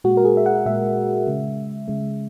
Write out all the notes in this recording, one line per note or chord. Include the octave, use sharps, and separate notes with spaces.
A#2 G#3 F#4
A#4
G#4
E5
F#5
A#2 G#3 E5
C#3 G#3
C#3 G#3